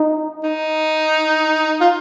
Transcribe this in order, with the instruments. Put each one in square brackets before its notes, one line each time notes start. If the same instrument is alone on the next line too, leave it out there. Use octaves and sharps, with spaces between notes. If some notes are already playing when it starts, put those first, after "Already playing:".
Already playing: [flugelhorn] D#4
[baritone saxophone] D#4
F4